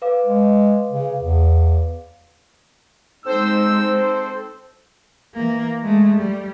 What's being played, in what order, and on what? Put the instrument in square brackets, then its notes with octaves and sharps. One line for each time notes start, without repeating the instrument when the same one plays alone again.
[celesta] B4 F5 D6
[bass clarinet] G#3
C#3
E2
[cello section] G#3 D#4 [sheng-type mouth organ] C4 A4 [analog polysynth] C5 [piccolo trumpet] E6
[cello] E3 A#3
G#3 A3
G3